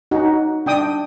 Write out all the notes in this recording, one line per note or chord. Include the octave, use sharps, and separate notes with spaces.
D#4 F#4
D4 G5 D#6